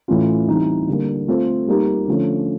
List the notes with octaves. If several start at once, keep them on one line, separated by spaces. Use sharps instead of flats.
A2 E3 A3 C#4 F4
E3 G3 C4 D#4
D3 G3 A#3
A3 C4 F4 A4 C5
G3 A#3 D#4 G4
D3 F3 A3 C#4